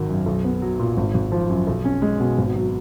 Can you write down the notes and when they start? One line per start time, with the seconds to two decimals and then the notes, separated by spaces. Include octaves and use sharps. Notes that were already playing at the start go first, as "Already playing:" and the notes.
Already playing: G#1 D#3 F#3
0.09 F#2
0.26 B1
0.44 B3
0.62 F#3
0.80 A#2
0.97 G#1
1.14 G#1
1.32 F3
1.49 F#2
1.67 B1
1.85 C#4
2.02 G#3
2.20 B2
2.38 G#1
2.55 F#3